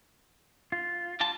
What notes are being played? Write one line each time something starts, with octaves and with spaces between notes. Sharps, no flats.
F4
G3 F4 A5